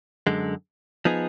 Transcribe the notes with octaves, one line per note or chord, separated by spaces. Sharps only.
F#2 D3 G#3
F3 B3 D#4 G#4